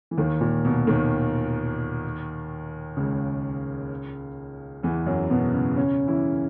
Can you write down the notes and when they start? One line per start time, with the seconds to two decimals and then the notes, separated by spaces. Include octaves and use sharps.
0.11 E3
0.18 D#2 D#3
0.41 A#2
0.65 B2
0.87 D#2 D#3
2.97 C#2 C#3
4.83 E2 E3
5.06 F#2 F#3
5.30 B2 B3
5.53 C#3 C#4
5.77 C#3 C#4
6.08 E3 E4